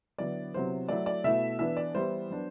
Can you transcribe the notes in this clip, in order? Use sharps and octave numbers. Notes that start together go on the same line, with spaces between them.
D3 F#3 B3 E4 D5
C3 F#3 B3 E4 C5
F#3 A3 E4 D5
D5
B2 A3 E4 E5
E3 B3 D4 E5
D5
E3 G3 B3 E4 C5
F#3 B3 D4